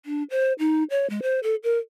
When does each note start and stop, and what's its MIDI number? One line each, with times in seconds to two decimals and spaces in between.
0.06 0.23 62
0.30 0.53 72
0.59 0.83 63
0.90 1.09 73
1.10 1.20 56
1.22 1.40 72
1.43 1.55 69
1.63 1.78 70